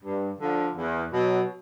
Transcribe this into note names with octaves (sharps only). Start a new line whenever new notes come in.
G2
D3 F3
E2
B2 F#3